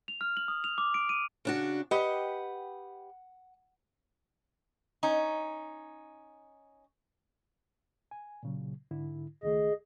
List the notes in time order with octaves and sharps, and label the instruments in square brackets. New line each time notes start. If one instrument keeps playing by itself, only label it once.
[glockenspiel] F7
F6
F#7
D#6
F7
D6
D7
D#7
[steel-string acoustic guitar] C#3 D4 F#4
[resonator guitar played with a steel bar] G4 B4 D#5 [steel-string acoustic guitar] F#5
[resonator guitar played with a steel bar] C#4 D#4
[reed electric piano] G#5
A#2 C#3 F#3
G#2 D3 E4
[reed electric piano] C#2 D#3 A3 [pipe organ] G#4 D#5